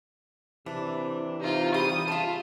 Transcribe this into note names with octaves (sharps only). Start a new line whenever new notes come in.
C3 E3 D4
C3 D#4 F4
G3 D#6
C#3 F4 E5 F#5 A5